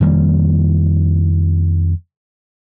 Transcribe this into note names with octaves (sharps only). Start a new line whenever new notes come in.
F2 D#3 G3 A#3